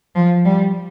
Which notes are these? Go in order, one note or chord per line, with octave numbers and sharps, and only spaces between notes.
F3
G3